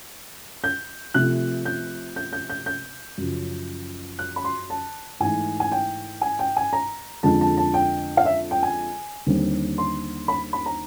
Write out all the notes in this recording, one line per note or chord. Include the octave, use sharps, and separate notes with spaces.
G6
C3 F3 A3 F#6
G6
G6
G6
G6
G6
F#2 C#3 F3
F#6
B5
C6
A5
G#2 E3 A3 G#5
G#5
G5
G#5
G5
G#5
A#5
F2 D3 F3 G#3 A5
A5
A5
G5
F5
E5
G5
G#5
D#2 D3 G3 C4
C6
B5
B5
A#5